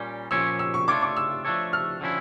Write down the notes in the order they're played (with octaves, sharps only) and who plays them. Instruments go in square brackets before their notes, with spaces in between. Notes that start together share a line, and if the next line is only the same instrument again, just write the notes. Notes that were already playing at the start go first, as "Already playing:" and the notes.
Already playing: [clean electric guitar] A#2 G3 C#4 G4
[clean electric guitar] A#2 F3 C#4 G4 C#5 [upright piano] E6
[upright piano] E6
C#6
[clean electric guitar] A3 D4 F4 C#5 [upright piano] D6
[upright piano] D6
E6
[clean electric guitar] F3 A3 D4 A4 C#5
[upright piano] F6
[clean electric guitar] D3 F3 C#4 E4